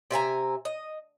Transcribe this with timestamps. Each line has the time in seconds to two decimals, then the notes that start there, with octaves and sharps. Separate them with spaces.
0.11 C3 E5 G#5 A#5
0.65 D#5